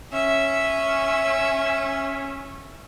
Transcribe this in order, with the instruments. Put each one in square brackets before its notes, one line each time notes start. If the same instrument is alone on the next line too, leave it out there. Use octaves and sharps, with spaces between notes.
[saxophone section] C#4 [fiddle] E5